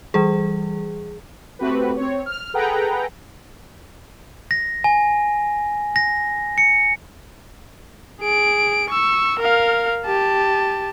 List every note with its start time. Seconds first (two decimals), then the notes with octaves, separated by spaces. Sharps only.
0.14 E3 G3 G#4
1.59 A3 C4 F#4 G4 B4
1.97 C4 C#5
2.26 F6
2.54 G#4 A4 B4 F#5 G5 A#5
4.51 A#6
4.84 G#5
5.96 A#6
6.58 C#7
8.21 G#4 D7
8.90 C#6 E6
9.39 A#4 F5
10.05 G4 A5